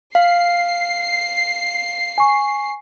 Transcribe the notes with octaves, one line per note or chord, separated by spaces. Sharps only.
F5 C7
G#5 C#6